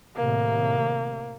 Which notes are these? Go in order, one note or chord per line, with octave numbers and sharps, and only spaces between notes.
A2 C3 D#3 A#3